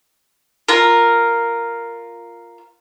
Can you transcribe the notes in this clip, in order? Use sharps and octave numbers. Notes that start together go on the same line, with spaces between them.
F4 A#4